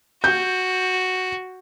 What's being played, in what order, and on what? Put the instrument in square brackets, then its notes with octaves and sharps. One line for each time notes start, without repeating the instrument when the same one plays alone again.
[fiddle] F#4 [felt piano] G6